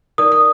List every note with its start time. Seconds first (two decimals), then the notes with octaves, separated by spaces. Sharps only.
0.18 D#4 A#4 D5 D#6
0.32 D#6